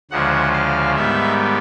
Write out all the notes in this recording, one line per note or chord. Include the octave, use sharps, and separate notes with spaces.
D2 C#3 F3 G#3 F#5
F5
G#2 D#3 G3 B3 E5